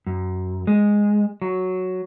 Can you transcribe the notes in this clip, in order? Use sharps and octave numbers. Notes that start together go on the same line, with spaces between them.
F#2
G#3
F#3